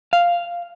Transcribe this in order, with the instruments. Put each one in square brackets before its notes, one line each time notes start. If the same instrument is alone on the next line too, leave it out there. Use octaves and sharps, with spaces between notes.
[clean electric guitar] F5